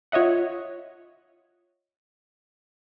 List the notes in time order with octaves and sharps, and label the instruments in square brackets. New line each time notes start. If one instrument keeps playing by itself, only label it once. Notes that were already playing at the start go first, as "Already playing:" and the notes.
[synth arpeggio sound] F4 C#5 D#5 E5 F#5